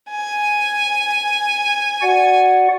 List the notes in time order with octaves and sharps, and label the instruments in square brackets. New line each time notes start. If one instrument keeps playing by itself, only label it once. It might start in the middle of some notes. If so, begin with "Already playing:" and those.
[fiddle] G#5
[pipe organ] F#4 D5 F#5